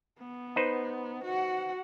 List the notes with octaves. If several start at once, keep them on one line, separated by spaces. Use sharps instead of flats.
B3
D#4 B4 C5
F#4 F#5